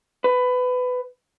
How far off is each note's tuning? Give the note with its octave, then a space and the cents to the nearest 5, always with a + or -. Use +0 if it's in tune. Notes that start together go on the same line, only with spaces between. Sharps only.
B4 +20